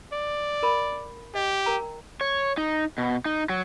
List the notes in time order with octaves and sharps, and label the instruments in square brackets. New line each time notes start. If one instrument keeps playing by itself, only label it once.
[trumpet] D5
[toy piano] A#4 B5
[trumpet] G4 [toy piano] D#5
[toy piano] A#4 G5 A#5
[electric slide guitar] C#5
D#4
B2
D#4
F#3